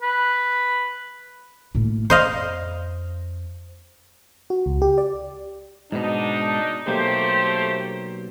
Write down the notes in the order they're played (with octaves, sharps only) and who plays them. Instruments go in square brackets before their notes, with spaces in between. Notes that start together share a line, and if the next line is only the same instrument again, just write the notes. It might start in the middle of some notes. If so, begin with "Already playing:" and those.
[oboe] B4
[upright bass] A2 A#3
[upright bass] F2 [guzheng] C5 D#5 F5
[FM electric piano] F#4
C#2
G4
D5
[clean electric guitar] G#2 B2 [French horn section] D4 D#4
[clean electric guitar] B1 A#3 [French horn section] A3 G4 C5